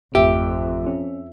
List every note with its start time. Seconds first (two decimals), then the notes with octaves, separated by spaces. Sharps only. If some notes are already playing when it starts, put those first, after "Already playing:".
0.15 G#1 F2 A3 G4 E5
0.86 C#4